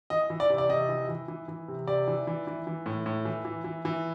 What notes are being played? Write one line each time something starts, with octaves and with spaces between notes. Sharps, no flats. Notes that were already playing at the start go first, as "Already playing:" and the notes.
E3 D#5
E3
D5
C3
D5
C3 D#5
E3
E3
E3
E3
C3
C3 D5
E3
E3
E3
E3
A2
A2
E3
E3
E3
E3